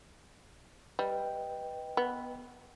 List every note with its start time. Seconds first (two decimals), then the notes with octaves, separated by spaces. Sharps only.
0.99 G3 B4 D#5 G5
1.97 B3